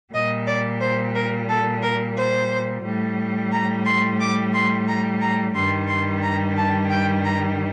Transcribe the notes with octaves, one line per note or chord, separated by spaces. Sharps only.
A#2 G3 D#5
D5
C5
A#4
A4
A#4
C5
A2 G3
A#5
C6
D6
C6
A#5
A#5
G2 D#3 G3 C6
C6
A#5
A5
G5
A#5